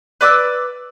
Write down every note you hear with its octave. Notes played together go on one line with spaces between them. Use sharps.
B4 D5 D6 E6